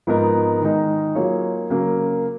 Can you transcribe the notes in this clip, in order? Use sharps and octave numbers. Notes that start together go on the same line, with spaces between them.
G#2 F3 B3 D#4 A#4
D#3 G#3 D#4
F#3 A#3 F4 G#4 C#5
C#3 F#3 A#3